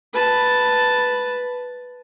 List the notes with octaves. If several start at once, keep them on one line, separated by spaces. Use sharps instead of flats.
B4 A5